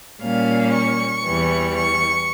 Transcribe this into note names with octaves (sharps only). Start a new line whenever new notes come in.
A#2 G3 A#3 C#4 F5
C#6
E2 E3 G3
C#6